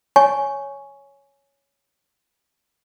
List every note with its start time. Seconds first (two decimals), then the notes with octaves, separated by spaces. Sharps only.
0.16 C#5 G#5 C#6